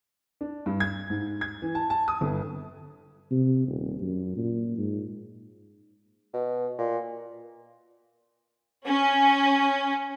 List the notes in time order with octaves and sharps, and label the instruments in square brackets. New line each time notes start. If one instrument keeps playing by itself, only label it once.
[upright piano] D4
G2
G#6
G#2
G#6
E3
A5
A5
D#6
G1
[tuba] C3
D#1
F#2
A#2
G#2
[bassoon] B2
A#2
[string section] C#4